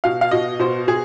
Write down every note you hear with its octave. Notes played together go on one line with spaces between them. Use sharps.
B2 F5
F5
B2 D#5
B2 C5
B2 G#4